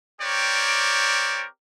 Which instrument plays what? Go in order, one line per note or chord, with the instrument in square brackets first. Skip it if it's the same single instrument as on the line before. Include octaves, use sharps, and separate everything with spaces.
[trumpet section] C4 G4 A#4 C#5 D5